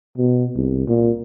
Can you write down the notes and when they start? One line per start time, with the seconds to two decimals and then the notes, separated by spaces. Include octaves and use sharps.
0.17 B2
0.55 C2
0.88 A#2